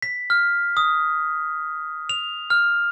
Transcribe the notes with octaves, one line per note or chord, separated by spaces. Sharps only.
B6
F6
D#6
F7
F6